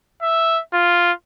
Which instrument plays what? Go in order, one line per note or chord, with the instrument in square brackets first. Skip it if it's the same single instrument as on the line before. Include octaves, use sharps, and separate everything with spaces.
[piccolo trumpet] E5
F4